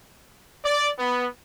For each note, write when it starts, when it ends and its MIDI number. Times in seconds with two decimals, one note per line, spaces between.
0.64 0.89 74
0.99 1.26 59